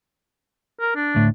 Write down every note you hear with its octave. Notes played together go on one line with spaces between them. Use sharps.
A#4
D4
D2 A2